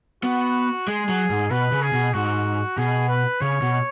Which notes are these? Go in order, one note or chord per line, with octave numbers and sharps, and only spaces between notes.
B3 F#4
G#3 G#4
F#3
G#2
B2 B4
C#3
G#4
B2
G#2 F#4
B2 G#4
B4
C#3 C#5
B2